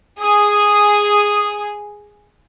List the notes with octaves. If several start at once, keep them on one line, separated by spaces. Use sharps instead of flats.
G#4 D#6